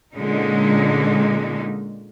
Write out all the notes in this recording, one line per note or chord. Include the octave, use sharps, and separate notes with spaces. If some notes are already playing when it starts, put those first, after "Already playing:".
A#2 D3 G#3 C#4 D#4